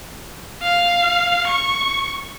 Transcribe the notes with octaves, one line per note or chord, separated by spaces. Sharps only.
F5
C#6